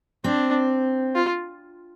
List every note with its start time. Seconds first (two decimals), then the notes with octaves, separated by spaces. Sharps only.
0.24 C4 D4
1.15 F4